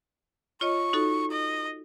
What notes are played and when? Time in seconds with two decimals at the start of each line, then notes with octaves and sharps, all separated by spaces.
0.61 F4 C#5 D#5 C#6
0.93 D#4 F#4 A4
1.31 D#5